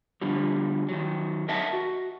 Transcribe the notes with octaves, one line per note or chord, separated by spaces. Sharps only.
D3 F3 G3
D#3 F#3
A#4 D#5 E5 F#5 A5
F#4